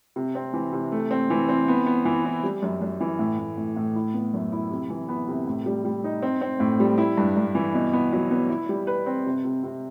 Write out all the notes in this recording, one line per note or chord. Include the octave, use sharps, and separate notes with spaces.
C3
C4
E3
C3
A3
C4
E3
C4
B3
B3
E3
E4
G3
F#2
F#2
E3
A2
A2
A2
A2
E4
B3
F#2
E4
C3
E3
B3
C3
A2
G3
G3
D#4
C4
C4
A2
G3
E4
G2
G2
E3
B2
B3
F#3
B3
E4
G3
B4
C4
C3
C3
C3